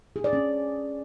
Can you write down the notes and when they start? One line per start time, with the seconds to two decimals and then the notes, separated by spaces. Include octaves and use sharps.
0.16 G#4
0.24 D5
0.33 C#4